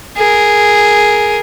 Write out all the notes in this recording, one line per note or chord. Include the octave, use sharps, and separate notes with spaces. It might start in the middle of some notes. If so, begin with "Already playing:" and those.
G#4 A#4